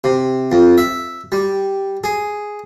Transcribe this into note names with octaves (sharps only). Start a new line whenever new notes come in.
C3
F2
E5
G3
G#4